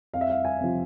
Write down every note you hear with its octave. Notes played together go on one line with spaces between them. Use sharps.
F2 F5
E5
F5
G#5
C3 F3